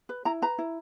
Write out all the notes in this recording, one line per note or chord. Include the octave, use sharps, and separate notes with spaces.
B4
E4 A#5
B4 A#5
E4